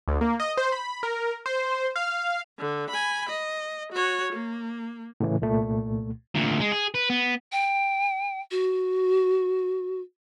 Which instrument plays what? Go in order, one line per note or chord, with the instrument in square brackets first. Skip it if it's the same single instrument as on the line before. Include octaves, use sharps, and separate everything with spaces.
[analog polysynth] D2
A#3
D#5
C5
B5
A#4
C5
F5
[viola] D3
G#5 B5
D#5
F#4 C#5
A#3
[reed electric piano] A2 C#3 E3
C2 A#2 A3
[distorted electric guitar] D2 A#2
G#3
G#4
B4
B3
[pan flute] G5
F#4